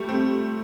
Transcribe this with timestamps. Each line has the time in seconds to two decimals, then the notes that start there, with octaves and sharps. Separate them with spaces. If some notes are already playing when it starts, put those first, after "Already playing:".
Already playing: G3 A3
0.09 C4